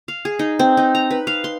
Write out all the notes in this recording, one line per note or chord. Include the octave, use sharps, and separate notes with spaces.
F5
G#4
D#4
C4
D#4
A#5
B4
F5
C6